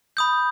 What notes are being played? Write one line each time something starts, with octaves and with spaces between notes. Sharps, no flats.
B5 D#6 G6